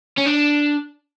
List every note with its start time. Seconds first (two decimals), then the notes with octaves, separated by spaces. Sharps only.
0.17 C#4
0.26 D4